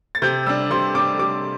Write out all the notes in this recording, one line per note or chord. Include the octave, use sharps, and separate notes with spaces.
A6
C3 G6
G3 D4 E6
C3 C6
G3 D4 D6
C3 D6